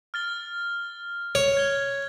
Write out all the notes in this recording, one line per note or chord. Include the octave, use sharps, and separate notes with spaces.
F6 A6 G7
C#5
G#6 G7